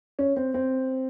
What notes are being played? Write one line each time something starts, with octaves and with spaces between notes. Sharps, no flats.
C#4
C4
C4